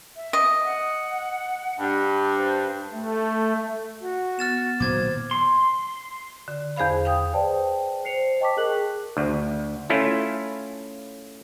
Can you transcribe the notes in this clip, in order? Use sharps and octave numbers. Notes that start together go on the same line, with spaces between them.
E5
D#5
F#5
G2
C5
A3
F#4
B3 F6 A6 E7
A#2 D#3 F#3 C5 D6 G#6
C6
D3
E2 G#4 C5 F5 B5
F5 G5 D#6
G#4 B4 C5 D5 G5 A5
C5 C7 C#7 F7
D#5 G5 A5 C#6 D6 B6
G#4 A#4 F#6 F#7
D2
A3 C#4 E4 F4